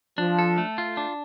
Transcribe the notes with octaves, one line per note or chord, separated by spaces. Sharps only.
F3 D4
A4
A3
F4
D4